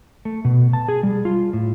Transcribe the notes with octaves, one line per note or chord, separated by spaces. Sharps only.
A3
B2
A5
G#4
G3
F4
A2